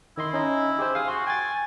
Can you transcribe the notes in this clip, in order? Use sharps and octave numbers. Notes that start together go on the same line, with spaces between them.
D#3 E4 D#5 C6
C#4 D#4 D#5
G4 G#4 C5
F5 G#5 D#6
F#4 C6
G5 G#5 A6